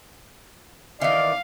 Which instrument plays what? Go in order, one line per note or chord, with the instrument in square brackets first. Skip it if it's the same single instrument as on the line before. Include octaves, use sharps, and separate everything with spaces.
[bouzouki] D#3 E3 [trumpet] D5 [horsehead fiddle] F5